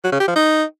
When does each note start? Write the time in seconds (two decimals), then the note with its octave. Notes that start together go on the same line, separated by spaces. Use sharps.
0.04 F#3
0.12 C#3
0.20 G4
0.28 F3
0.36 D#4